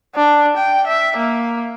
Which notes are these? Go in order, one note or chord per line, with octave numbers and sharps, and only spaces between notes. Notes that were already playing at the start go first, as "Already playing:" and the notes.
D4
G5
E5
A#3